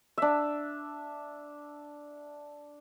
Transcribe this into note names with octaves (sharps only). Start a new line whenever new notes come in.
D4 E5